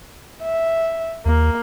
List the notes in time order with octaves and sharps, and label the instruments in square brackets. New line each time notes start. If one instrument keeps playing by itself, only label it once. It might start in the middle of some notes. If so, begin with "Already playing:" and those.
[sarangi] E5
[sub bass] D#2 [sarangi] A#3